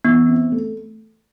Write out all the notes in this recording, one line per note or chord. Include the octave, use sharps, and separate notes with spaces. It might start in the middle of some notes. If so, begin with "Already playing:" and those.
E3 B3
C4
A3